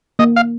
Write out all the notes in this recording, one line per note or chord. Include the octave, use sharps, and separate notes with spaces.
A#3 D#5
F5